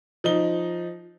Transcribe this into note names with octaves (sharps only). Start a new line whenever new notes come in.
F3 D#4 G7